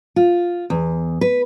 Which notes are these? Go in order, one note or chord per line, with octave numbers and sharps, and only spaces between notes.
F4
E2
B4